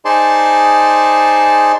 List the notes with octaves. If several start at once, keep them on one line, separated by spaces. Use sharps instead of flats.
D#4 G#4 C5 D5 A5 C6